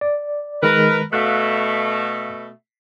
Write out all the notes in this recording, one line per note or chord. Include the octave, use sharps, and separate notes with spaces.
D5
D#3 G#3 A#4 B4
B2 A3 F5 F#6